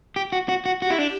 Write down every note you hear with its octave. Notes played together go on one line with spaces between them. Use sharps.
G4
F#4
F#4
F#4
F#4 G4
E4
D4